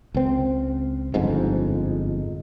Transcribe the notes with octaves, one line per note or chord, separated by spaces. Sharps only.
C#2 C4
G1 F2 G#2